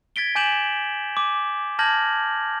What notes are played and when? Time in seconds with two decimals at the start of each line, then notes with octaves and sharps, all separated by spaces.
0.16 G#6 A6 B6 D7 G7
0.35 G#5 D6 G6 D7 E7 F#7
1.17 G#5 D6
1.79 A5 F6 G6 G#6 A#6 F#7